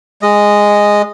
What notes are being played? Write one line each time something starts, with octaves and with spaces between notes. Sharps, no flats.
G#3 D#5